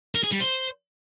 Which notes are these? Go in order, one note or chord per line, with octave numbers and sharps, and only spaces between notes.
A#4
G#4
G3
C5